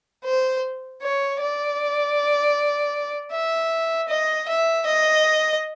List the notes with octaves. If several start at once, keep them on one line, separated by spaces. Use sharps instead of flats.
C5
C#5
D5
E5
D#5
E5
D#5